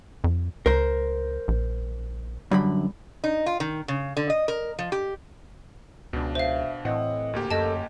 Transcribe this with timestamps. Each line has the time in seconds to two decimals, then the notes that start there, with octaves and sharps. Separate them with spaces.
0.24 F2
0.66 C#2 A#4 C5
1.48 A#1
2.51 F#2 D3 G3 B5
3.24 D#4
3.46 F4
3.60 D#3
3.88 C#3
4.17 D3
4.30 D#5
4.48 A#4
4.79 F3
4.92 G4
6.13 C#2 B2 D4
6.35 C5 E5 F5
6.85 A2 E3 C4 D#5 F#5
7.33 D2 A#3 G4
7.51 F#2 A4 D#5 A5